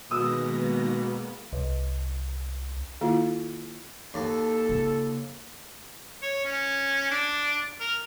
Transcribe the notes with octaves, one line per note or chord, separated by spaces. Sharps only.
B2 D#3 G#3 A#3 B3 D#6 E6 A#6
C2
D#3 A#3 E4 F4
D#2 A4
C#3 F4
C#5
C#4
D4
A#4